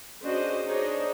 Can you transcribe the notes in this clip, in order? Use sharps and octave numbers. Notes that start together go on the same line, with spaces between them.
C#4 D4 F#4 G#4 C5 D#5
D4 D#4 G#4 C5 C#5 D#5